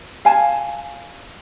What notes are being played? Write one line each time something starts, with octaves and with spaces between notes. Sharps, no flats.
F5 G#5 A5